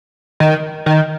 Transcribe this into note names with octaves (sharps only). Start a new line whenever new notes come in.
D#3
D#3